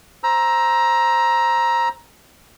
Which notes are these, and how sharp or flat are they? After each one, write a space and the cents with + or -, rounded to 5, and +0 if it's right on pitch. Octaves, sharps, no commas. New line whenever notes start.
C5 +0 A#5 +15 E6 +0